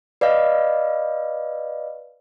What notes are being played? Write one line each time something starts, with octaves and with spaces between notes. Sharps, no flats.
B4 D5 D#5 F5